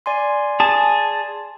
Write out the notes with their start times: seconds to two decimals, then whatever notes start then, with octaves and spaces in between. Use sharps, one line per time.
0.06 D5 G#5 C6
0.60 G#4 A5